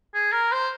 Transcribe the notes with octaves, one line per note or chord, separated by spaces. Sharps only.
G#4
A#4
C5